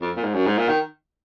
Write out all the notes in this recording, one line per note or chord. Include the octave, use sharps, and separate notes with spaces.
F2
A#2
G#2
F#2
G#2
A#2
D#3